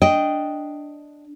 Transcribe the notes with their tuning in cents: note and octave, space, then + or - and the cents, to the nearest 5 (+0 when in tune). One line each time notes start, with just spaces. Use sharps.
D4 +0 D#5 +0 G5 +0